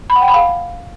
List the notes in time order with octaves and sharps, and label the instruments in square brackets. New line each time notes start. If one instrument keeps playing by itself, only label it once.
[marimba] B5
F#5
G5
B5
F5